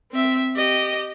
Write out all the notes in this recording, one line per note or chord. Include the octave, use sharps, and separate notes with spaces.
C4 E5
G4 D#5